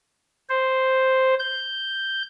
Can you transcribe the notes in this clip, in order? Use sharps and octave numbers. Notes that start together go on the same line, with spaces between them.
C5
G6